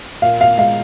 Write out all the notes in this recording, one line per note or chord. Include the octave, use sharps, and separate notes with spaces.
A#2 F5
F5
G#3 F5